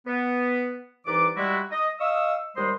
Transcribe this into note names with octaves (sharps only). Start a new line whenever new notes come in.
B3
C2 E3 D#4 B4 D5 D6
G3 G#3 E4 F#4
D#5
D#5 F5 C#6 D#6 E6
D#2 G3 G#3 C5 D#5 C6